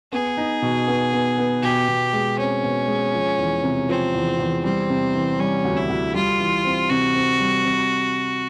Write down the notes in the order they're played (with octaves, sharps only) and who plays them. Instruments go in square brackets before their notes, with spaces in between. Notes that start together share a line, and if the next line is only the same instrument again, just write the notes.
[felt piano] B3 [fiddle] G#4
[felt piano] D#4
B2
B3
B3
B3
[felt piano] B2 [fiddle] G4
[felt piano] B2
G#3
[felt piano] C4 [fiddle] C#4
[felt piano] B2
G#3
F3
E2
C3
[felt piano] F3 [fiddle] C4
[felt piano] E2
E2
[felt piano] G3 [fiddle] C4
[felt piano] C3
E3
[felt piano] G3 [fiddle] C#4
[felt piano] D2
[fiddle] E4
[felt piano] D2
[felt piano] G3 [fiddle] F4
[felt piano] E3
C4
[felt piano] C3 [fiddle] F#4
[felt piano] C4
G3
C3